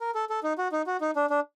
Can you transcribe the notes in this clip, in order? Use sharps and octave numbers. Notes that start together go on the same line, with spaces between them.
A#4
A4
A4
D#4
F#4
D#4
F#4
D#4
D4
D4